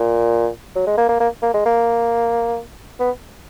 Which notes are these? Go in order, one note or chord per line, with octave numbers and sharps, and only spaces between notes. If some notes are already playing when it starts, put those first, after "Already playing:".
Already playing: A#2
F#3
G#3
A#3
A#3
A#3
A#3
G#3
A#3
B3